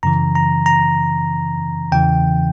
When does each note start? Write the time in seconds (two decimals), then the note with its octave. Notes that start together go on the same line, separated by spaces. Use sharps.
0.03 F#2 C#3 E3 A#5
0.35 A#5
0.66 A#5
1.92 E2 C#3 E3 G5